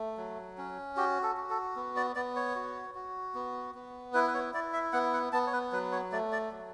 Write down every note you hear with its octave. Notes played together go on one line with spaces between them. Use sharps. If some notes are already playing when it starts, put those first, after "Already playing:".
Already playing: A3
F#3
C#4
F#4 G4
A4
F#4
A4
B3
D5
B3 D5
C#5
F#4
F#4
B3
B3
E4 B4
B4
C#5
E4 D5
E5
B3 F#5
F#5
B3 A5
C#5
B4
F#3 B4
C#5
A3 D5
D5
F#3